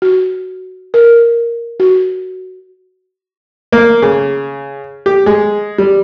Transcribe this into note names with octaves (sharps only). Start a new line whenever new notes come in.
F#4
A#4
F#4
A#3
C#3
G4
G#3
G3